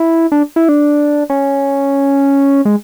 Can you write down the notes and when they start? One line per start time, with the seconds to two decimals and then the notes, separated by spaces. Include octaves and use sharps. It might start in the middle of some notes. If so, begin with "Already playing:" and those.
Already playing: E4
0.32 D4
0.56 E4
0.69 D4
1.30 C#4
2.65 G#3